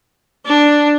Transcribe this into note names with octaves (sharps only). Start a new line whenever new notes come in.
D4